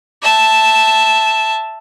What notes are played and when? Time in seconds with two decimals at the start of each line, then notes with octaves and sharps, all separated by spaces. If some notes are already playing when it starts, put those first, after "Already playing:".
0.22 E5 A5